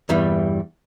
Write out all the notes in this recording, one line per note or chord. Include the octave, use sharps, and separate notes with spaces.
E2 G2 E3 G3